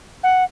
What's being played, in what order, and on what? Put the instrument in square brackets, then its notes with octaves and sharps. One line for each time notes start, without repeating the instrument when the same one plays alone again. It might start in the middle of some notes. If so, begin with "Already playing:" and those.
[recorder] F#5